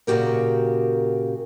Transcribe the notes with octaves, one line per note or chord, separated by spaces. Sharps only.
A#2 C#3 G#3 F#4 G4 A#4